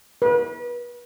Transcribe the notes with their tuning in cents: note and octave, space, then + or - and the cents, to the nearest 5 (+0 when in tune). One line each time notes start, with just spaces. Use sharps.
B4 -35